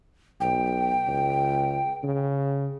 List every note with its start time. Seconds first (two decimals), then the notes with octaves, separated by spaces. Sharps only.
0.41 B1 G5
1.08 C#2
2.04 C#3